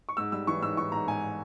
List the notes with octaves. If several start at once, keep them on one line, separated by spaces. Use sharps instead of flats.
C#6
G#2 E6
G3 E6
E3 C#6
G#2 E6
E3 C#6
G#2 A#5
G#2 G#5